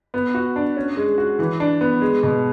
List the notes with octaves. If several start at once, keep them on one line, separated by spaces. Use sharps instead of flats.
B3
F#4
D4
C#4
G#3
F#4
E3
D4
B3
G#3
B2